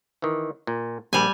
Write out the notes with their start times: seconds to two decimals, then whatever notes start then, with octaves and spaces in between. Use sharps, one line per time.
0.22 D#3 E3
0.67 A#2
1.13 A#1 G3 G#5